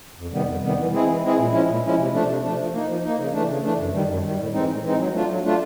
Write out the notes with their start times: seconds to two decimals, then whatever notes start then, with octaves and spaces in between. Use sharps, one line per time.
0.17 F2
0.32 C3 D#3 G3 B3
0.47 F2
0.62 C3 D#3 G3 B3
0.77 E3
0.92 G#3 C4 E4 G#4
1.07 E3
1.22 G#3 C4 E4 G#4
1.37 A#2
1.52 F3 G#3 C#4 E4
1.67 A#2
1.83 F3 G#3 C#4 E4
1.97 C3
2.12 F3 A3 D4
2.27 C3
2.42 F3 A3 D4
2.57 F3
2.72 A#3 D#4
2.87 F3
3.03 A#3 D#4
3.18 C#3
3.33 E3 A3 D4
3.48 C#3
3.63 E3 A3 D4
3.78 F#2
3.93 D#3 G3
4.08 F#2
4.23 D#3 G3
4.38 A2
4.53 E3 G#3 C4 D#4
4.68 A2
4.83 E3 G#3 C4 D#4
4.98 F#3
5.13 A3 D4 F4
5.28 F#3
5.44 A3 D4 F4